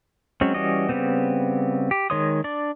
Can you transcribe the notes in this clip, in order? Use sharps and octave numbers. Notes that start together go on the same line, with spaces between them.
F#3 G#3 C4 C#4
E3 G3 C#4 F#4 D#5
C#3 F3 G3 B3 C4
G4
D#3 G#3 C#5 C6 D#6
D4 D5